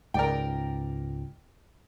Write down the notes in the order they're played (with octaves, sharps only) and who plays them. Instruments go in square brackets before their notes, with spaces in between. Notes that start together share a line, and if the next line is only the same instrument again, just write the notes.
[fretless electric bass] C#2 G#2 [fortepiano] A#4 D5 G5